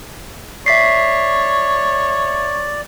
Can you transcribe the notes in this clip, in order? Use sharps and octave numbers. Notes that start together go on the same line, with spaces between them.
C#5 D5 E5 B6 C7